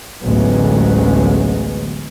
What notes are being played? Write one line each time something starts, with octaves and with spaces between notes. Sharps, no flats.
A1 D2 F#3 G#3 B3